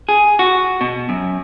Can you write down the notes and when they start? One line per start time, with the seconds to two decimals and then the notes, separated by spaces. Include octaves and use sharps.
0.09 G#4
0.39 F#4
0.81 B2
1.09 F#2